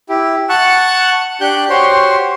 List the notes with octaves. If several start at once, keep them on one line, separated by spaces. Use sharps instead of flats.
E4 G4
F#5 A5 C#6 F#6
D4 G4 F#6 G6
F#4 G4 C5 C#5 C6